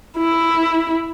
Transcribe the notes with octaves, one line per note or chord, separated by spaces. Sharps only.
E4